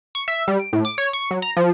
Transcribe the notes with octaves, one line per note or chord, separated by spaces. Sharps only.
C#6
E5
G3
D7
A2
D6
C#5
C#6
F#3
A#5
F3